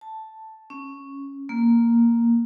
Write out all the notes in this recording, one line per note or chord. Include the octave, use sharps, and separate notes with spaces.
A5
C#4
A#3